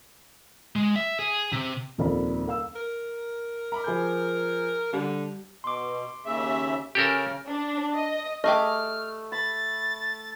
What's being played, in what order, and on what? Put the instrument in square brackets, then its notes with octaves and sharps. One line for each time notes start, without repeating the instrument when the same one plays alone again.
[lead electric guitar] G#3
E5
G#4
C3
[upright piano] D#1 F2 C3 A#4 D5 B5
A#4 F5 E6
[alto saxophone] A#4
[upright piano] A#5 B5 D6
F3 G#4 G6
[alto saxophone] D3 [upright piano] G3
[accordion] B2 [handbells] C6 D6
[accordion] D#2 C#3 E5
[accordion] C#3 [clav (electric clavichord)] G4 A4 A#4
[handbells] F6
[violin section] D4
D#5
[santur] A3 [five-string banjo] G4 G#4 D#5 [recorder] F6
[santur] B5 [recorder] A6